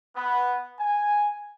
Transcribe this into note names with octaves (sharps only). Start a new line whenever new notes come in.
B3
G#5